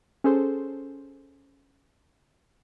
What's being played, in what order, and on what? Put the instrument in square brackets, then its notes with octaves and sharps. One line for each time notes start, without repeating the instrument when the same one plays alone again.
[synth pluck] C#4 G#4 A4 C5